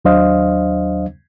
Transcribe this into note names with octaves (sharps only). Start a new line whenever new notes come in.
D#2 F#3 D4 C5 D#5 F5